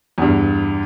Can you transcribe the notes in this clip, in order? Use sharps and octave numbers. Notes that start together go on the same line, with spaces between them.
E2 G2